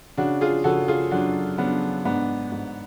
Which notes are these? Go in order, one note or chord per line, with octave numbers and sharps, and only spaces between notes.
C#3 D4 F#4
F4 G#4
C#3 F#4 A4
F4 G#4
F#2 D4 F#4
C#3 B3 D4
G#2 B3 D4
G#2